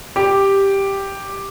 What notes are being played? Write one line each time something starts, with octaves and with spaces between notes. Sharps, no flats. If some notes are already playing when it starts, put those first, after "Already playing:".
G4